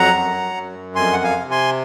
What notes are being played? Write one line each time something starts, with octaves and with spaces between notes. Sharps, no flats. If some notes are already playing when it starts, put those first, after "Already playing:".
Already playing: F2 F#3 F#5 A#5
F#2
F#2
F2 G#5 C6
F#5
F5 G#5
C3
G#5 C6